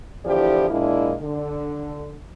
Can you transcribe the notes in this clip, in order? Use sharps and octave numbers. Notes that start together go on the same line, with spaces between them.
E2 D3 F3 E4 G4 D5
A#2 G#3 A#3 D4 E4
D3